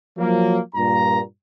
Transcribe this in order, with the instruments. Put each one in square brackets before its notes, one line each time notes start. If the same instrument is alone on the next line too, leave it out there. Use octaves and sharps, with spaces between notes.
[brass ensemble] F3 F#3 A#3
G2 A#2 A#5